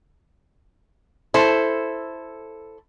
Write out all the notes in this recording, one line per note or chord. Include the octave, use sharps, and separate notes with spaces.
E4 A4 C5